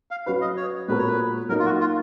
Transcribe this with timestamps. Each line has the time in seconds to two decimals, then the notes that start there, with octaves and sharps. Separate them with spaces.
0.11 F5
0.26 F#3 C#4 F#4 B4 F5
0.41 D#5
0.57 C#5
0.88 A#2 G#3 B3 F#4 A#4 B4
0.98 C#5
1.08 B4
1.49 F#3 A#3 D#4 A#4
1.59 F4
1.65 F#4
1.80 F4